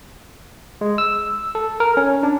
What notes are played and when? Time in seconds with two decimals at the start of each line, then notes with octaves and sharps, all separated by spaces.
0.81 G#3
0.98 E6
1.55 A4
1.80 A#4
1.97 C#4
2.23 D4